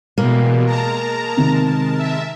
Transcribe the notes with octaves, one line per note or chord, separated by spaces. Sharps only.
B2 E3 G3 G#3 A#3
G#3 A#4 A5 A#5
C3 D#3
E5